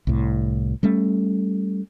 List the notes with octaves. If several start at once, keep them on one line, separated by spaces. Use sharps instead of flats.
C2 A2
G3 A3 C#4